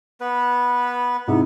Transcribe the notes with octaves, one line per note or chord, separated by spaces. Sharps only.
B3 B4
G#2 C3 B3 E4